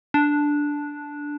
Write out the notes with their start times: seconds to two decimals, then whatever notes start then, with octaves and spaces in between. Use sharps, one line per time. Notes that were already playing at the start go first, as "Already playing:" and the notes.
0.14 D4